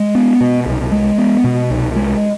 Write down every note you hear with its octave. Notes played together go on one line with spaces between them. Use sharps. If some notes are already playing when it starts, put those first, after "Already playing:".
Already playing: G#3
B3
B2
C2
G#3
B3
B2
C2
G#3